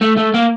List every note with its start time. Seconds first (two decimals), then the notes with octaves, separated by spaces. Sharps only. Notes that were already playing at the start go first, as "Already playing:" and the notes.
0.01 A3
0.17 A3
0.34 A#3